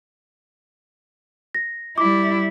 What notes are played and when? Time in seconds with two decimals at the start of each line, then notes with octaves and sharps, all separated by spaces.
1.55 A#6
1.98 G3 E4 D6